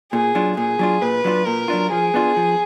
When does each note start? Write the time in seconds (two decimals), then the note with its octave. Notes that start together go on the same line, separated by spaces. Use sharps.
0.12 A#2 G#4
0.35 F#3 D4 F4
0.57 A#2 G#4
0.79 F#3 D4 F4
1.02 A#2 B4
1.24 F#3 D4 F4
1.46 A#2 A#4
1.68 F#3 D4 F4
1.91 F3 G#4
2.14 B3 D4 F4
2.36 F3